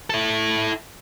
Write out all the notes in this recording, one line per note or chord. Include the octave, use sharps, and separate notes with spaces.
E4 A4